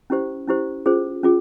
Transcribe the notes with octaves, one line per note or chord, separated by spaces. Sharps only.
C#4 E4 G4 C5
C#4 E4 G4 C5
C#4 F4 G#4 C5
C#4 F4 G#4